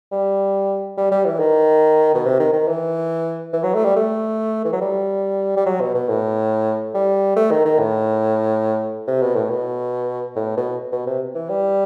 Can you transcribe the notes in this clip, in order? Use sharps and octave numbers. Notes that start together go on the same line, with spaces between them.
G3
G3
G3
E3
D#3
B2
C3
D#3
D#3
E3
E3
F#3
A3
G3
A3
E3
F#3
G3
G3
F#3
B2
B2
A2
G3
A3
D#3
D#3
A2
C3
B2
A2
B2
A2
B2
B2
C3
E3
G3